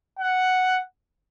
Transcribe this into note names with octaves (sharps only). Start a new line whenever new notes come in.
F#5